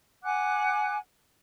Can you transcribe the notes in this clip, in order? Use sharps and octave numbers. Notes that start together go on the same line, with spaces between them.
F#5 G#5 D6 F#6